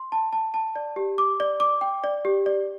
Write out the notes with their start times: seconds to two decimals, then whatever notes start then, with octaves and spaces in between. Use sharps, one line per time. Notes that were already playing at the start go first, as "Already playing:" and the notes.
Already playing: C6
0.12 A5
0.33 A5
0.54 A5
0.76 D5
0.96 G4
1.18 D6
1.40 D5
1.60 D6
1.81 G5
2.04 D5
2.25 G4
2.46 D5